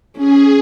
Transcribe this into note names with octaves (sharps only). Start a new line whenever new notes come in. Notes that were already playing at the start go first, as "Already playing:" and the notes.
C#4 G#4